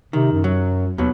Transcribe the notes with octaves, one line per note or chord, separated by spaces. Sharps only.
C3 D#3
F#2
F#3
D#2 B2 F#3